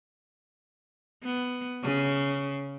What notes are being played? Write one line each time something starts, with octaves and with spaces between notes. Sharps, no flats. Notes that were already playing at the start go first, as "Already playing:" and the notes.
B3
C#3